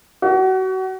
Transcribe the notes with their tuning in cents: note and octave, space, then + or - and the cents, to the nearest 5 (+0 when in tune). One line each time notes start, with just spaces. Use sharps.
F#4 +30